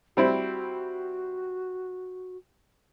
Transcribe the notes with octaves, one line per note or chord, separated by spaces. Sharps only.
G3 C4 E4 F#4